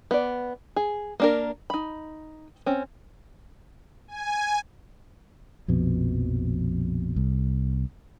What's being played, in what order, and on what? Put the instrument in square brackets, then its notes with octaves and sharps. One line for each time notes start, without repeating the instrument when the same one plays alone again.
[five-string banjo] B3 D5
G#4
A#3 D4 A#4
D#4 B5
C4 C#4
[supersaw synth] G#5
[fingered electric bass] A#1 F2 B2
C2